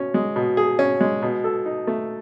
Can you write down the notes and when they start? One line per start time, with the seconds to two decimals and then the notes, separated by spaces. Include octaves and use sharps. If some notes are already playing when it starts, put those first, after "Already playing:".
Already playing: B2 C#4
0.14 G#3
0.36 B2
0.57 G#4
0.79 C#4
1.01 G#3
1.22 B2
1.44 A4
1.66 D#4
1.87 A3